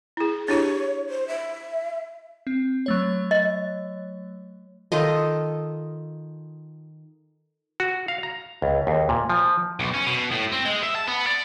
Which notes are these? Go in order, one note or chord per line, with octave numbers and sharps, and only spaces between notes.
E4 G#4
D4 E4 G4 C#5
C5
E5
C4
F#3 A3 C#5
D#5
D#3 F4 A4 D#5
F#4
F5
A#5
C#2
D#2
A#2
F3
B1
C#4
B2
A2
C4
G#3
E5
A5
B3
D5